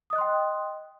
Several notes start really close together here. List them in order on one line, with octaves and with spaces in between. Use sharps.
D#6 D#5 F#6 C6 G5